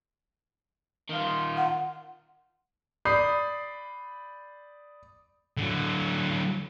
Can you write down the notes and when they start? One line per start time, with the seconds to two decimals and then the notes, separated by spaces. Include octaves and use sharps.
1.09 D#3 F4
1.57 F#5
3.05 D5 B5 D#6 G6 C7
5.57 D3 F#3